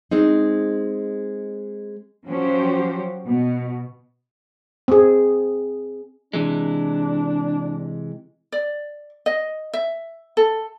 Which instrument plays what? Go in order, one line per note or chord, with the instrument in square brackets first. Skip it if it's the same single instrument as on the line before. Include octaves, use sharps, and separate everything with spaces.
[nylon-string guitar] G#3 C4 D#4
[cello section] F3 F#3 C#4 F#4 G4 C5
B2
[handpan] C4 G#4
[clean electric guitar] C3 E3 G#3 [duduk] D4
[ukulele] D5
D#5
E5
A4